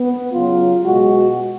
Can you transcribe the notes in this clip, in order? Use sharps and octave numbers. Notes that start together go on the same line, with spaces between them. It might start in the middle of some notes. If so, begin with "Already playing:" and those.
Already playing: B3
C#3 F#3 F4
B2 G#3 F#4